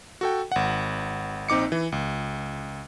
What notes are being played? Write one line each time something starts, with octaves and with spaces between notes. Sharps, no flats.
F#4 A4 G5
G#1 F#5
A#1 C4 D#4 D6 C#7
E3
C#2